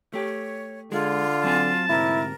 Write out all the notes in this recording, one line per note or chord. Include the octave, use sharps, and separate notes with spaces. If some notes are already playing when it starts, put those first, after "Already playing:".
A3 G4 C#5
D3 G#3 F4 G#4
F#3 C4 G#5 A5
D2 G#2 C3 E4 A#4